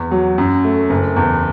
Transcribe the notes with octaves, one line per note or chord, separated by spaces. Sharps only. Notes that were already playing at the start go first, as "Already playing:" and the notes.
Already playing: E2
F#3
F#2
A3
F#1
E2